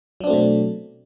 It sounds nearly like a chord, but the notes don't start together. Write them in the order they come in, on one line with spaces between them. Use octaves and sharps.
F#3 D4 C4 A3 B2